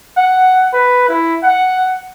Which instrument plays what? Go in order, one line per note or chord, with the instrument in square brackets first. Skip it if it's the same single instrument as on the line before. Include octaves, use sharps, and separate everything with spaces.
[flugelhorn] F#5
B4
E4
F#5